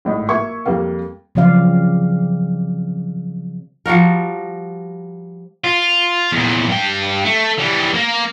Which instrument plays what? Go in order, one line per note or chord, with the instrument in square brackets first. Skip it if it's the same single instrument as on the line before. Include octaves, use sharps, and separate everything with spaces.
[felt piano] G#1 A2 D#5
A#3 E5 C#6 G#6
F2 G3 A#3 F5
[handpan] C#3 F3 F#3 C4 D5 F5
[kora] F3 G3 F#4 A#4
[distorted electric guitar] F4
E2 A#2
G2 G5
A3
E3 G3
A#3 A#4